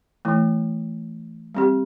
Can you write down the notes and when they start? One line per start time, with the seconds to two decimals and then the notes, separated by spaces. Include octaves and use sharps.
0.25 E3 A3 E4
1.55 G3 C4 G4